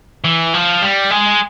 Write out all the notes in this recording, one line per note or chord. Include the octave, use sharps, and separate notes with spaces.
E3
F3
G3
G#3